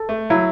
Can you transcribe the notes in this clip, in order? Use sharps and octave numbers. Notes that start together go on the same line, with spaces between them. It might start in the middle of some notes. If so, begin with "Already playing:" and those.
Already playing: A4
A3
F#3 E4